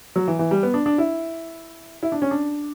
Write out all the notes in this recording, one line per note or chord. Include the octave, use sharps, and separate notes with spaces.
F#3
E3
E3
G3
B3
D4
D4
E4
E4
D4
C#4
D4